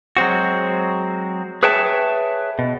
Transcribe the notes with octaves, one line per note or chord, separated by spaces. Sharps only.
F#3 G#3 C4 F#4
G#4 B4 C#5 E5 G5 A5
B2